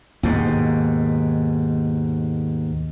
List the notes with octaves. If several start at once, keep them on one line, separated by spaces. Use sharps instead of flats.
D#2 G#2 B2